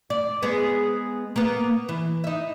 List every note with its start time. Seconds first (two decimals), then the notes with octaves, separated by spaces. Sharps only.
0.10 D5
0.42 G#3 B3 G#4
1.36 A#3 B3
1.89 E3
2.24 D#4 E5